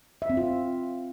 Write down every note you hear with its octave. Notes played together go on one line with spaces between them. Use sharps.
E5
C4
F4